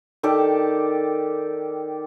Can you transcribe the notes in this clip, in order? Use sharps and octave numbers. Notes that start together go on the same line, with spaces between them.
D#3 G4 A4 D5